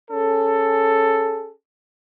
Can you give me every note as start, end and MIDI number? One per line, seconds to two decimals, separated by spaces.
0.10 1.52 61
0.10 1.52 68
0.10 1.52 69